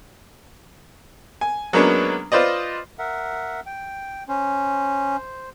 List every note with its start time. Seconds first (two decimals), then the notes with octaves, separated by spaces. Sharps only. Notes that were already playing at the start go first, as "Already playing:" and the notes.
1.41 G#5
1.73 F#3 G#3 A#3 B3 C#4 D4
2.32 F4 B4 C5 D5 D#5
2.99 A#4 E5 F#5
3.66 G5
4.28 C#4 C5